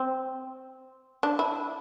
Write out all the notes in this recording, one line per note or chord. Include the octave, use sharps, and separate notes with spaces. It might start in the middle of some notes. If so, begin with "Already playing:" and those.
Already playing: C4
D4
E4